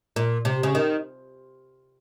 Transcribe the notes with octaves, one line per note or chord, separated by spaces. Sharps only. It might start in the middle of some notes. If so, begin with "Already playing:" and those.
A#2
C3
C#3
D#3